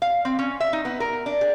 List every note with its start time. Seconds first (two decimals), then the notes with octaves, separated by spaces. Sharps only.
0.02 F5
0.25 C4
0.39 C#4
0.60 E5
0.73 D#4
0.85 B3
1.00 A#4
1.26 D4
1.41 G#4